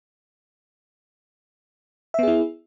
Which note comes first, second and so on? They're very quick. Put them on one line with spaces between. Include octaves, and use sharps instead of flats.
E5 B3 G#4 E4